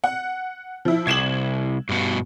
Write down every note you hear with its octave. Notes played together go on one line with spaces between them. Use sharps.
F#5
F3 E4
C2 G#6 E7 F#7
G2 B2